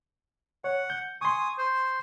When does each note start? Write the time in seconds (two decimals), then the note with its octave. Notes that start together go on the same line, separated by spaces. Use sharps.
0.64 C#5 F#5
0.90 G6
1.21 G#5 C6 C#6 D#6
1.58 C5